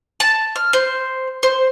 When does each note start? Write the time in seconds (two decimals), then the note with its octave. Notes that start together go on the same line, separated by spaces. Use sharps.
0.20 A5
0.56 F6
0.73 C5
1.43 C5